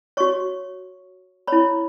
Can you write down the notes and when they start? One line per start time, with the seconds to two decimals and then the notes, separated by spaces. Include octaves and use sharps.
0.17 F#4 C#5 C#6
1.47 E4 C#5 B5